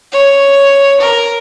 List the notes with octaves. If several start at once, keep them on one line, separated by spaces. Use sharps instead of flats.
C#5
A#4